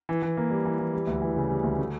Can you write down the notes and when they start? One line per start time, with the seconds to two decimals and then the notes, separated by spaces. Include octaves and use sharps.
0.09 E3
0.22 E3
0.37 A#3
0.51 G3
0.65 E3
0.79 E3
0.94 G3
1.07 D2
1.22 E3
1.37 C#3
1.50 G3
1.64 D2
1.79 A3